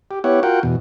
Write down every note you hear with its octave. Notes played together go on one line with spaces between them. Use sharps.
G4
B3 E4 G4 C#5 F#5
F4 F#4 A#4 F#5 G5
E2 B2